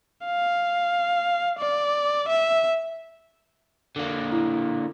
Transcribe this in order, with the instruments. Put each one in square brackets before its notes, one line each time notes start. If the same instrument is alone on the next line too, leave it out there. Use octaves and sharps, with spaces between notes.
[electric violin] F5
D5
E5
[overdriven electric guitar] D3 A#3
[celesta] E4